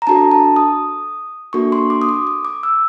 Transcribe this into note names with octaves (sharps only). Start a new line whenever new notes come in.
A#5
D4 F#4 A4 A5
A5
D#6
A#3 D4 F#4 A4 C#6
C6
D6
D#6
D6
D6
D6
E6